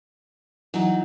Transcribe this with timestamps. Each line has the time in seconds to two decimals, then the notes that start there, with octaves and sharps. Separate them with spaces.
0.74 E3 F#3 D#4